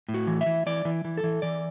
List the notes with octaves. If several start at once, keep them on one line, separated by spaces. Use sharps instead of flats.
A2
F#4
E3
E5
E3
E3 D5
E3
E3
A4
E3
E3 D5